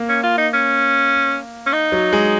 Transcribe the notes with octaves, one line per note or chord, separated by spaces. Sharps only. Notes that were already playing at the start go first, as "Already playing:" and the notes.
Already playing: A#3
C#4
F4
D#4
C#4
C#4
D#4
F#3
G#3